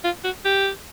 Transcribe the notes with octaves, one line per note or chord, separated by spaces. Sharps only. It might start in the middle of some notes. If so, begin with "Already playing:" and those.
F4
F#4
G4